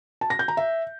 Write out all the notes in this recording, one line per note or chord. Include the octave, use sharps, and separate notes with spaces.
A5
A#6
G6
A#5
E5